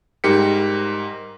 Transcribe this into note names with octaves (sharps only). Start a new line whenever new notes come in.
G#2 G3 G4 A#4 B6 C#7